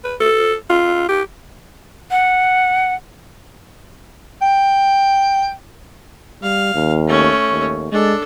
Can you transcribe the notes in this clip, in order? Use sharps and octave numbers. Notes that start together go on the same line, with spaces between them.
B4
A4
F4
G4
F#5
G5
G3 F5
D#2
A3 C#4
D#2
G#3 D4 A4